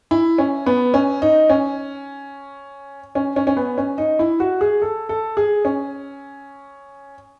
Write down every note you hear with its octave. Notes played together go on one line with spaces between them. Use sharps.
E4
C#4
B3
C#4
D#4
C#4
C#4
C#4
C#4
B3
C#4
D#4
E4
F#4
G#4
A4
A4
G#4
C#4